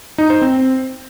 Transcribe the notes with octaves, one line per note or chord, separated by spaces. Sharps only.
D#4
C5
C4